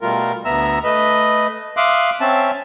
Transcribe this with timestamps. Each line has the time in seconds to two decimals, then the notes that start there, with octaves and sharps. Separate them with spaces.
0.01 B2 G3 A3 F4 A#4
0.45 D2 B3 E5 A#5 E6
0.84 A3 B4 D#5
1.77 E5 F5 C6 D6 D#6 F#6
2.20 C4 C#4 E5 A5